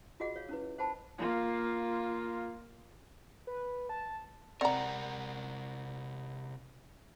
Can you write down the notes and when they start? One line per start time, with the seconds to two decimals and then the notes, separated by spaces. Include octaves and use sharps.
0.20 F4 F#4 G#4 D#5 F#5
0.36 C#5 F5
0.49 C#4 E4 B4
0.78 C5 F#5 G5 A5 B5
1.18 A#3 F4
3.47 B4
3.89 A5
4.61 C3 C4 A#4 D5 F#5 A#5